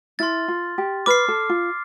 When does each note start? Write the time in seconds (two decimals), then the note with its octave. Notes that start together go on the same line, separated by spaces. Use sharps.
0.19 E4 C6 F6 A6
0.48 F4
0.78 G4
1.06 B4 D6 F6 C7
1.28 A4
1.49 F4